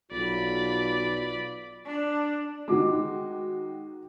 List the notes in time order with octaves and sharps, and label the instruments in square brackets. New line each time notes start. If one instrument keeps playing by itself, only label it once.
[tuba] B1 [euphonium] F4 [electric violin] D5 B5
[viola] D4
[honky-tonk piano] D#3 F#4 D6 [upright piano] G#3